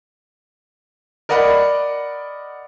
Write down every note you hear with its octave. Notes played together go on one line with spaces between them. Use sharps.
A#4 D5 D#5 F#5 B5